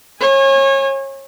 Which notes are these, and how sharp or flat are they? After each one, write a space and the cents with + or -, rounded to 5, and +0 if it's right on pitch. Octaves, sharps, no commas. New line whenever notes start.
C#5 -30 G#5 -20